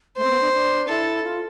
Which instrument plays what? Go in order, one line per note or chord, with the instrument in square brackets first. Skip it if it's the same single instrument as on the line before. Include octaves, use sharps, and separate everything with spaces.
[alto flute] A3 [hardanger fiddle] C5
[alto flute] C4
B3
D4
D4
[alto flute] E4 [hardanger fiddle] A4
[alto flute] F4